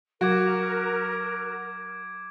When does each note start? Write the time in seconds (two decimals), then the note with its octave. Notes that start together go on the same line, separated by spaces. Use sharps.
0.21 F#3 F#4 A#4 D6 G#6 D7